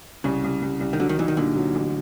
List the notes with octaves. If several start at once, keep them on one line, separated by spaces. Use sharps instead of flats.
C2 C#3
C2
C2
C2
D#3
D3 F#3
D#3
E3 D#4
D#3
A#2 D3
F#3
A1